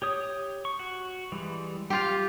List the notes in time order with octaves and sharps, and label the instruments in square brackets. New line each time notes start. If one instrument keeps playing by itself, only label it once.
[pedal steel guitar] G4 C#5 D#6
C#6
F#4
E3 G3 G#3
[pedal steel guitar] G3 F5 [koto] F4 G4